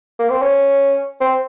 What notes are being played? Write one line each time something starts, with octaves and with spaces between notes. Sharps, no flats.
A#3
C4
C#4
C4